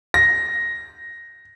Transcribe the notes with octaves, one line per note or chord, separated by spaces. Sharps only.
A#6